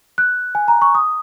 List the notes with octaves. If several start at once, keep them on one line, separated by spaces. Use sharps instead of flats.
F#6
G#5
A#5
C#6
D#6